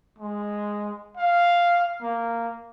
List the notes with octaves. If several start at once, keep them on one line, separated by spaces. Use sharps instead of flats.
G#3
F5
A#3